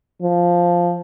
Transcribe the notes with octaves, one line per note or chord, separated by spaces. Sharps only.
F3